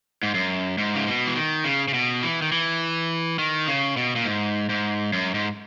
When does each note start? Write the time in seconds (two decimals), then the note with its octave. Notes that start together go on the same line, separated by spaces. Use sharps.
0.23 G#2
0.34 F#2
0.78 G#2
0.95 C#3
1.07 B2
1.27 E3
1.36 D#3
1.64 C#3
1.88 C#3
1.94 B2
2.23 E3
2.42 D#3
2.52 E3
3.39 D#3
3.68 C#3
3.97 B2
4.15 A#2
4.25 G#2
4.69 G#2
5.13 F#2
5.34 G#2